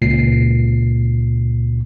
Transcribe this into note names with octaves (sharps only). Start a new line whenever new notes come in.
C#2 A#2 C7